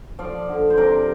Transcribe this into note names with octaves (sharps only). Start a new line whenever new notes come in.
F3 D5 F5
D3
C5
C3 A#4 D5